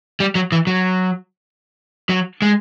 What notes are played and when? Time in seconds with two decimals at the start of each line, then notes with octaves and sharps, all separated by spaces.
0.20 G3
0.35 F#3
0.52 E3
0.67 F#3
2.10 F#3
2.42 G#3